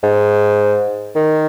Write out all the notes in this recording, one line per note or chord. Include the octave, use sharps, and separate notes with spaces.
G#2
D#3